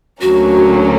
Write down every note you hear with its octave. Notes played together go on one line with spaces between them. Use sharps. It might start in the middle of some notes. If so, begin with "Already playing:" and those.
D2 D3 F#3 A#3 C#4 F#4